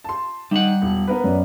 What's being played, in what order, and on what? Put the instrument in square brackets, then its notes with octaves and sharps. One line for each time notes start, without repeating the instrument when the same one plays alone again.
[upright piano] A5 C6
[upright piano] D#3 D#4 [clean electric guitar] G3 F#5
[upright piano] E1
B3 A#4 B4
[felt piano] F#2 D5